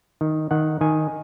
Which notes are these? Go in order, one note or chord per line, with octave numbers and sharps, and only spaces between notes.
D#3
D#3 F#5
D#3 G#5